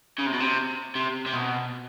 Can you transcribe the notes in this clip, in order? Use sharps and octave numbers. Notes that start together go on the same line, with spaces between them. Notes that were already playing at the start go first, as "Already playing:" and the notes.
C#3
C3
B2
C3
C3
C3
B2